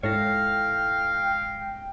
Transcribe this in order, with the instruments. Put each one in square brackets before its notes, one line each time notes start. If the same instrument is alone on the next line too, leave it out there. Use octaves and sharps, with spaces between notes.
[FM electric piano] G#2 A#6 [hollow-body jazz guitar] E4 A4 C#5 [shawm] F5 [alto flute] G5